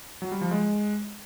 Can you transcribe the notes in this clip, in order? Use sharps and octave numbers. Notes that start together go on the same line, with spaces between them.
F#3
G3
F3
G#3